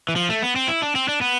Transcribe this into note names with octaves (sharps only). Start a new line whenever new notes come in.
E3
F3
A3
B3
C4
E4
D4
C4
D4
B3